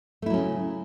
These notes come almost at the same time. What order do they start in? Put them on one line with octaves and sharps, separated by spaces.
A3 E4 F#3 C#4 C#3